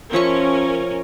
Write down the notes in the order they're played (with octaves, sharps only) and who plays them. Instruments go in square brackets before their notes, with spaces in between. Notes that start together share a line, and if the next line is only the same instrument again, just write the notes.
[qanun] F3 E5 C#6 [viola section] C#4 A#4